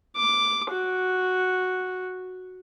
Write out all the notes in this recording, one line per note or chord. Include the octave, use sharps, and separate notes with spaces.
D6
F#4